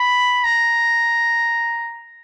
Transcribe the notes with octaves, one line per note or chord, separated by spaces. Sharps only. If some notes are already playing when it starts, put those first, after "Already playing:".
Already playing: B5
A#5